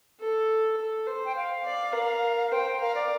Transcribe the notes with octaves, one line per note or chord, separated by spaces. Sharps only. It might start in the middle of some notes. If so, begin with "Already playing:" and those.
A4
A4
C5
G5
F5
D5
A#4
C5 G5
A#4 F5
D5